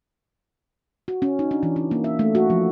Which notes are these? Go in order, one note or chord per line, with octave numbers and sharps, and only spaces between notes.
F#4
C#4
D#4
D4
E3
C#4
A#3
E5
A3
F#4
F3